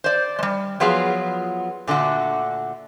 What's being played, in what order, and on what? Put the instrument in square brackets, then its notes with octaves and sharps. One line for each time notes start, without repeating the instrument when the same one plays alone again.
[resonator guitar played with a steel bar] C5 D5
G3 G#3
F3 F#3 B3 F4 G#4
A#2 D3 A3 F#4